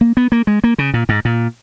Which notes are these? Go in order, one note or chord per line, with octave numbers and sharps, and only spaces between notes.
A#3
B3
A#3
G#3
A#3
C#3
A#2
G#2
A#2